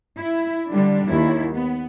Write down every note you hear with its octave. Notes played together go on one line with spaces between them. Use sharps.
E4
D3 G3 D4
D#2 E4
B3